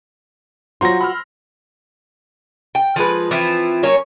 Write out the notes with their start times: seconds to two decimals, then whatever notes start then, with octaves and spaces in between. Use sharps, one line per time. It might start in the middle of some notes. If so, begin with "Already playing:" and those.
0.81 F#3 F4 F#4 C5 A#5 C6 A#6
1.01 B5 E6 F6
2.75 G5
2.96 F3 G#3 B4
3.31 E3 F3 C4 E4
3.83 F#3 A#3 C#4 C#5